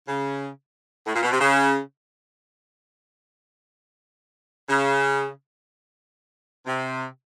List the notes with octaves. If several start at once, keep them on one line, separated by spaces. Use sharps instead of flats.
C#3
A2
A#2
B2
C3
C#3
C#3
C3